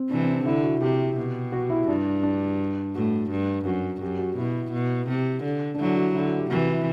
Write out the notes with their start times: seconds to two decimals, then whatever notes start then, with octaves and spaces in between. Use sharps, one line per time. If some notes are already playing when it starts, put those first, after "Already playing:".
Already playing: C4
0.10 C3 E3 D4
0.22 C4
0.34 D4
0.45 D3 E4
0.64 F#4
0.81 C3 G4
1.17 B2
1.52 F#4
1.70 E4
1.88 G2 D4
2.23 D4
2.95 A2 F#4
3.31 G2
3.65 F#2 F#4
4.01 F#2 G4
4.19 F#4
4.37 B2 E4
4.72 B2
5.08 C3 G4
5.44 D3
5.74 D4
5.79 D3 F#3 E4
5.97 F#4
6.14 D3 E4
6.26 F#4
6.39 G4
6.50 C3 E3 F#4
6.68 E4